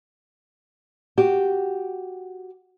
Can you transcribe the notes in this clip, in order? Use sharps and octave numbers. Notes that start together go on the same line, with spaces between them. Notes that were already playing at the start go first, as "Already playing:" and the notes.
F#4 G4